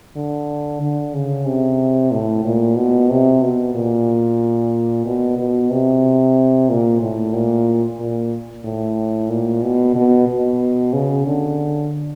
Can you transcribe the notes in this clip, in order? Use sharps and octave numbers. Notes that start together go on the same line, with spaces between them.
D3
D3
C#3
C3
A2
A#2
B2
C3
B2
A#2
B2
B2
C3
A#2
A2
A#2
A#2
A2
A#2
B2
B2
B2
C#3
D3